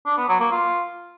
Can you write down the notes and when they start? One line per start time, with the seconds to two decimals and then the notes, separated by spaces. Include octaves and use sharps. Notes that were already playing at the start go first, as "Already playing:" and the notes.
0.06 D4
0.17 B3
0.29 F#3
0.40 A#3
0.51 F4